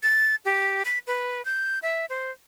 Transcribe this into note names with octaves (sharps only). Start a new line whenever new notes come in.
A6
G4
B6
B4
G6
E5
C5